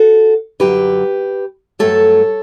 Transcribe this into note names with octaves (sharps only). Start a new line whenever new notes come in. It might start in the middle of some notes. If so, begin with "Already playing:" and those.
Already playing: F#4 A4
F#2 D3 F#3 G4 B4
G2 F#3 A3 A4 C#5